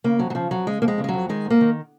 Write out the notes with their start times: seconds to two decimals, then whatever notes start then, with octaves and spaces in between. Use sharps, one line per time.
0.04 C#3 A#3
0.19 F2 F#3
0.30 F#3
0.35 C#3 F3
0.51 F2 F#3
0.67 C#3 G#3
0.82 F2 A#3
0.88 G#3
0.98 C#3
1.04 G#3
1.09 F2 F#3
1.29 D#3 G#3
1.45 G#2
1.50 A#3
1.61 D#3